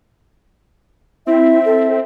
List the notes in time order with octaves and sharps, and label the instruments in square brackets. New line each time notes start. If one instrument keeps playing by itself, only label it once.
[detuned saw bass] C4 [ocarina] E4 [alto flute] E5
[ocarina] A4